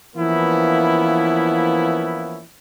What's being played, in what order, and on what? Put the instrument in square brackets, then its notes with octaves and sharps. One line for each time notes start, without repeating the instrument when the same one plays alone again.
[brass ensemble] E3 F3 A#3 B3 C#4 E4